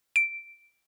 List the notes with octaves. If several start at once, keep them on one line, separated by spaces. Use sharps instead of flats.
D7